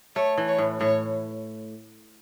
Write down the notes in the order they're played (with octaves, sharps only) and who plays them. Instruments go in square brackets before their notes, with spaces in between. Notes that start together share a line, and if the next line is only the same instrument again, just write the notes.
[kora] A3 [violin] C#5
[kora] E3
[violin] C#5
[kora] A2
[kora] A2 [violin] C#5